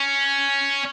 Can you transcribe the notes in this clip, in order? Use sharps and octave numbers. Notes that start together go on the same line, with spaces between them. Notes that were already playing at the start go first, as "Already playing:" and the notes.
Already playing: C#4